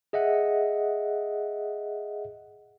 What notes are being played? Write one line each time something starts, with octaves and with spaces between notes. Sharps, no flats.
G#4 D#5 E5 F#5